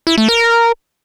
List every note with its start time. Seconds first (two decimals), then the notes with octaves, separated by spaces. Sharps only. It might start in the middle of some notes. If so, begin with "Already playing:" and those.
0.07 E4
0.18 A3
0.28 A#4